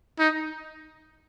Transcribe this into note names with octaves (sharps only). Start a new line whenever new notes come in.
D#4